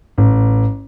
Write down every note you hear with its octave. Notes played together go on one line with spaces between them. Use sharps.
A1